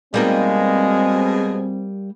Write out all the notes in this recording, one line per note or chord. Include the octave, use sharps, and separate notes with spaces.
B2 G3 G#3 A#3 C4 D#4 G#4